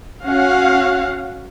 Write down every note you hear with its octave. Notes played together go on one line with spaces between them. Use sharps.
C#4 F#4 F5 F#5